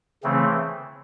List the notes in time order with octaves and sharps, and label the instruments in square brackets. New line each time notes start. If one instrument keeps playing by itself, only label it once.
[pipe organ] C#3 E3 A3 C4